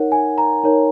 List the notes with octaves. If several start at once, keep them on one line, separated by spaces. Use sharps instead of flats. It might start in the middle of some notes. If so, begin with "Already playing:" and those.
Already playing: D#4 A#4 C#5 F#5
G#5
A#5
D#4 A#4 C#5